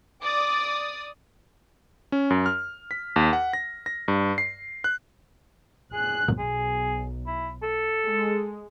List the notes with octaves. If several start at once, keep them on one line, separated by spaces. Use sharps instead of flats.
D5 D6 D#6
C#4
F#2
F6
B6
D#2
F#5
A#6
A#6
G2
C7
F#6
G#4 F#6
B1 G#4
E4
A4
G#3